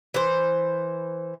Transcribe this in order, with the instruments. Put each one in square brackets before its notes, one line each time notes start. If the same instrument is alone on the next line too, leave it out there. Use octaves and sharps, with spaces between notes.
[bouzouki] E3 C5